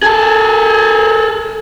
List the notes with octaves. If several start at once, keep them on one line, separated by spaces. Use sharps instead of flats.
G#4 A4